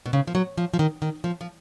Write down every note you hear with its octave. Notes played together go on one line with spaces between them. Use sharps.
B2
C#3
F3
F#3
F3
F3
D#3
D#3
F3
F3